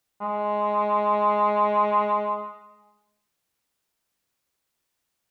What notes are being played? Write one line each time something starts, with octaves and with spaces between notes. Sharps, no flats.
G#3